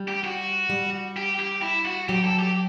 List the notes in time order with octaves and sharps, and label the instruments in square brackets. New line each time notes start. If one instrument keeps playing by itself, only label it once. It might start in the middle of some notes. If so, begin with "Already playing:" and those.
Already playing: [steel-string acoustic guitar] G3
[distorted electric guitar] G4
F#4
[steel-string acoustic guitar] G3
[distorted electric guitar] G4
G4
E4
F#4
[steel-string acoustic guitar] F#3 [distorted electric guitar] G4
[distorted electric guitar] A4
G4